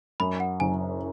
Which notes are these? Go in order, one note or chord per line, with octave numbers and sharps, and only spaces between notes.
F#2 B5
F#5
F#1 G#5